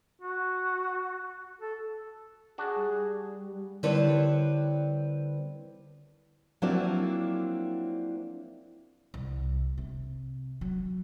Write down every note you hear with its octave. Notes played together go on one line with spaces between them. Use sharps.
F#4
A4
D4 F#4 G#4
G3
D3 G3 C4 E4 B4 C#5
F3 F#3 A#3 C4 D4 E4
C2
C3
F#3